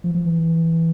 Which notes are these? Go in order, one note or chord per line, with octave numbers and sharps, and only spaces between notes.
F3
F3
E3